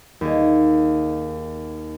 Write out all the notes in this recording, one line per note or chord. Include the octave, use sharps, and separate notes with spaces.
D#2 G#4